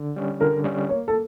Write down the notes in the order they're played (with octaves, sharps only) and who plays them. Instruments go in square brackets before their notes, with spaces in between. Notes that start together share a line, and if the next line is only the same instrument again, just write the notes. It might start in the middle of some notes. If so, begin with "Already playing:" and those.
Already playing: [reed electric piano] D3
G3 C#4
[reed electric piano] D3 [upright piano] A#4
[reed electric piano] G3 C#4
[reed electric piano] A#3 [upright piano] C#5
[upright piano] A4